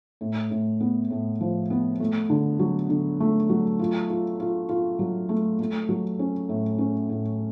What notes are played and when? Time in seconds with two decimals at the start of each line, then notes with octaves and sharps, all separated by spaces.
0.21 A2
0.51 A2
0.80 B3
1.11 A2
1.41 F3
1.70 B3
2.00 A3
2.30 D3
2.59 F#3
2.89 D3
3.20 A3
3.50 F#3
3.79 F4
4.10 F4
4.40 F4
4.69 F4
4.99 F#3
5.29 A3
5.60 A3
5.89 F#3
6.19 C#4
6.49 A2
6.78 C#4
7.09 A2